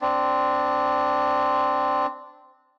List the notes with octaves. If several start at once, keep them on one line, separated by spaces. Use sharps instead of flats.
C4 D4